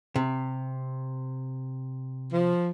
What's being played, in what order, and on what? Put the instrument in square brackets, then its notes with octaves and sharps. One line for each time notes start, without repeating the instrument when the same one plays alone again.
[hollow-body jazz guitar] C3
[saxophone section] F3